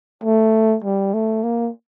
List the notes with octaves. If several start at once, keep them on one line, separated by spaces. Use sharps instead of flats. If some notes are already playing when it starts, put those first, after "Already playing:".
A3
G3
A3
A#3